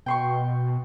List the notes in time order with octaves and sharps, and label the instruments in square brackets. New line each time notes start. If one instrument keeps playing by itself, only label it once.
[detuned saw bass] B2 [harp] G5 C6 C#6